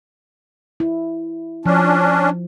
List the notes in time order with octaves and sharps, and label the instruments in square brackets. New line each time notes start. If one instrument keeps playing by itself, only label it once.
[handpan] E4
[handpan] F3 [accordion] C#4 D4